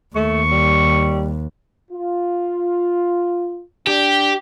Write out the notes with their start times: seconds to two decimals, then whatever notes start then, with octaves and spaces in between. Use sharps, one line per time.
0.16 D#2 A3 C#6
0.51 G3
1.91 F4
3.87 D4 G4